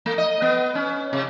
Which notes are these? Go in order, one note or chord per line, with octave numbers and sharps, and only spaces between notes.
A3
D#5
B3
C#4
C3